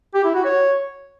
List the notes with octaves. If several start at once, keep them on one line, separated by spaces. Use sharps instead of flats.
G4
E4
F#4
C#5